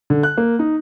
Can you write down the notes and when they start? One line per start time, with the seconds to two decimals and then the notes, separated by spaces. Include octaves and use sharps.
0.10 D3
0.23 F#6
0.38 A#3
0.59 D#4